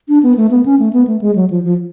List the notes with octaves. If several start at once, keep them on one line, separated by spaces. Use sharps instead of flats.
D4
B3
A3
B3
C#4
A3
B3
A3
G#3
F#3
F3
F3